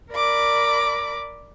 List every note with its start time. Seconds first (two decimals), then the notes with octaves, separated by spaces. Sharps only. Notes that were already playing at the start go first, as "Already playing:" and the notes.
0.12 A#4 D5 B5 D6